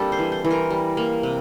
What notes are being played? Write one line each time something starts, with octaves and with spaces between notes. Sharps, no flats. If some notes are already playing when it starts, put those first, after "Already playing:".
Already playing: G3 A#3 C4 D4 G4 A4
C5
E3
C5
E3
A#4
G3
A#3
C3